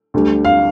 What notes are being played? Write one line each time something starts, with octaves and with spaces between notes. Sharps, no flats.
D2 D3 G3
F5